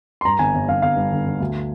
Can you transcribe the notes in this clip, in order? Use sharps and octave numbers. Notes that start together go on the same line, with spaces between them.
C6
G2 A#5
G1 G#5
G1
G1 F5
G1 F5
G2
D3
D3
D2